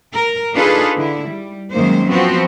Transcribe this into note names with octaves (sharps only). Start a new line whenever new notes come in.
A#4
D4 D#4 F4 G#4 A4 B4
D3 E4
G3
F#2 D#3 G#3 A#3 C5
F3 B3 C4 F#4